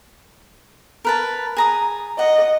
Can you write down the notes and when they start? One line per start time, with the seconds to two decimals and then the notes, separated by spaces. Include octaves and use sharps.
1.05 A#4 B4 A5
1.57 G#4 A#5 D#6
2.19 D#5 F#5